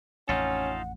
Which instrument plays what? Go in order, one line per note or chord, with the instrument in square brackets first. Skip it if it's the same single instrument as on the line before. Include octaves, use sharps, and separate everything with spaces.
[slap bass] A1 F2 [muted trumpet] C#4 [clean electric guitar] D#4 F4 A4 [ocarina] F#5